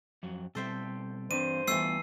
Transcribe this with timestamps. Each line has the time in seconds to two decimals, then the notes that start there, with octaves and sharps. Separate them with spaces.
0.23 F2 F#3
0.55 B2 G3 C4 A4 C5 E5
1.31 G2 E3 C4 C5 D#7
1.67 E3 G3 A3 B3 F4 E6 C7